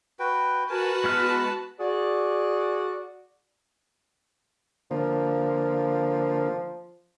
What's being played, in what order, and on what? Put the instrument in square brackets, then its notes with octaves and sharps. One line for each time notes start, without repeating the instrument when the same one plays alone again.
[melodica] F#4 B4 G5
[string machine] F#4 F#5 [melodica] A#4 G#5 [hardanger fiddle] B4 A5
[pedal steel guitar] G#3 B3 F6 [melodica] E4
[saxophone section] F#4 G#4 D5
[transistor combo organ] D3 A#3 [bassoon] F3